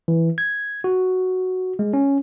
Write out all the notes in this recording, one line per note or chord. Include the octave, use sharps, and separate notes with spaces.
E3
G#6
F#4
G#3
C#4